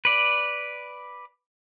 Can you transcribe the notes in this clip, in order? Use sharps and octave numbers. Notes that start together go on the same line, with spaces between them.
B4 D5